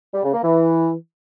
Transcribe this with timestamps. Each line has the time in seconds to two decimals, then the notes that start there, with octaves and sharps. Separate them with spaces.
0.14 G3
0.24 C#3
0.34 A#3
0.44 E3